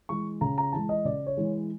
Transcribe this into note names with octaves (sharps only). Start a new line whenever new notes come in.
E3 G#3 C#6
C#3 A#5
A#5
E3 G#3 A5
D#5
C#3 D5
C#5
E3 G#3